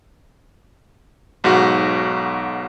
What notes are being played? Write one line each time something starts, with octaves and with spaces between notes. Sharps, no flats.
B1 G#2 F#4